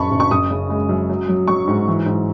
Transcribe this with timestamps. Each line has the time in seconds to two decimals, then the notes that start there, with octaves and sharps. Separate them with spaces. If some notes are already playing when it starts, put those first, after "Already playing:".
Already playing: F#1 F#2 C#3 A5 B5 C#6
0.11 F#1
0.20 C#6
0.31 F#1 D#6
0.50 C#3
0.70 G#3
0.89 F#2
1.10 F#3
1.29 F#3
1.48 F#3 C#6
1.68 G#2
1.88 E3
2.06 G#2